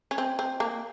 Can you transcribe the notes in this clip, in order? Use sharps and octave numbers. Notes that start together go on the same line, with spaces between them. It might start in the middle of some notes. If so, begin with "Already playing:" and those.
C#4
C4
C4
A#3